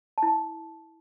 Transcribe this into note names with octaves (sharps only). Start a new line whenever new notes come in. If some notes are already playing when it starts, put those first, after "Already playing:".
A5
E4
A5